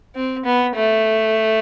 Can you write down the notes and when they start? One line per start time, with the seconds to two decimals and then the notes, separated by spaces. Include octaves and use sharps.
0.15 C4
0.45 B3
0.76 A3